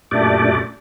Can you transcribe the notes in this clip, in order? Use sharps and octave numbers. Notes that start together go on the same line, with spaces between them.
F#2 A#2 A3 D4 G4 D5